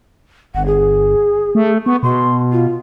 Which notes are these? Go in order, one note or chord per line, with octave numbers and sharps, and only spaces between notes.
G1 F#5
G#4
A3
B3 C#6
B2 C6
F4